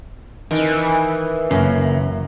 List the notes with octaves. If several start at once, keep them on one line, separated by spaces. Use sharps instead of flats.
D#3 E3
F#2 C#3 A#3